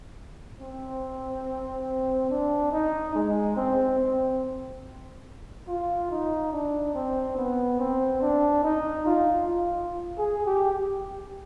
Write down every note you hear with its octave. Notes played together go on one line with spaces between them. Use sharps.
C4
D4
D#4
G#3
C4
C4
F4
D#4
D4
C4
B3
C4
D4
D#4
F4
F4
G#4
G4